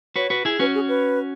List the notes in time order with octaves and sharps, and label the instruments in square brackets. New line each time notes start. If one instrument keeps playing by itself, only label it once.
[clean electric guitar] F#4 B4 [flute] C#5
[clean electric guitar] F#4 B4
E4 G#4
[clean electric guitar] C#4 F#4 [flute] B4
[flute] G#4
B4